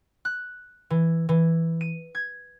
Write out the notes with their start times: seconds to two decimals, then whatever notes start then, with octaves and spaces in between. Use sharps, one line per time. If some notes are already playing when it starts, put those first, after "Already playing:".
0.25 F#6
0.90 E3
1.29 E3
1.81 D#7
2.15 G#6